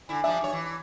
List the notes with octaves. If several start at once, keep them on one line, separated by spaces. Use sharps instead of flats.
D3 E4 G#5
F3 G3 D4 E5
G2 C#5
E3